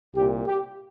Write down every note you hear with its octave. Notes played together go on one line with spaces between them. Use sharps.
C2 A#2 G4
G4